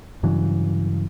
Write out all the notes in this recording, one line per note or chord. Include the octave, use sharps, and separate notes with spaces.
G2 C#3 E3 F#3